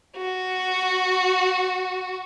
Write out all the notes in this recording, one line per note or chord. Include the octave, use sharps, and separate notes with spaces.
F#4